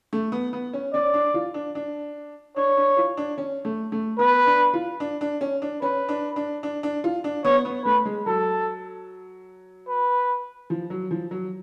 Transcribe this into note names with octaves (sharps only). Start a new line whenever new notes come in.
A3
B3
B3
C#4
C#4 D5
D4
F4
D4
D4
D4 C#5
D4
F4
D4
C#4
A3
A3
B3 B4
D4
F4
D4
D4
C#4
D4
C#4 B4
D4
D4
D4
D4
F4
D4
B3 C#5
B3
A3 B4
G#3
F#3 A4
B4
F3
F#3
F3
F#3